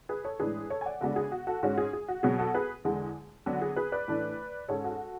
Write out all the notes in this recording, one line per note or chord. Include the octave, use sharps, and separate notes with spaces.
G#4 B4
A4 C#5
A2 E3 G#3 D4 G#4 B4
A4 C#5
G#5
D5 F#5
C#3 G#3 B3 D4 F#4 A4
G#4
F#4
F#4 A4
G#2 G#3 C#4 F#4
G#4
G#4
F#4
B2 F#3 B3 G#4
F#4 A4
G#4 B4
E2 D3 G#3
D3 F#3 B3 D4 F#4
G#4
G#4 B4
B4 D5
A2 E3 A3 D4
G#2 G#3 C#4 A4 C#5
F#4 A4